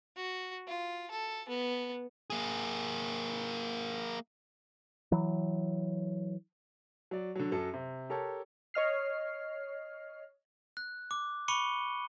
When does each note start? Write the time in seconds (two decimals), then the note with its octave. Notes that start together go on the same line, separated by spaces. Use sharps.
0.17 F#4
0.67 F4
1.11 A4
1.49 B3
2.30 A#3 G#4
5.12 E3 F#3
7.11 F#3 D5
7.35 D3 F#3
7.52 F#2 F#3 A4
7.74 C3
8.10 G4 A4 A#4 C#5 A5
8.74 C#5 D#5 F6 C7
10.77 F#6
11.11 D6
11.48 B5 C#6 D6 C#7 D#7 G7